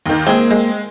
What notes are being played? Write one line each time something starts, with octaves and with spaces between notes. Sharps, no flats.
D#2 D#3
G#3 A#3 C4 G#4
G#3